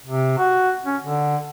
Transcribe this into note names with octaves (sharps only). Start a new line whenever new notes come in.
C3
F#4
C#4
D3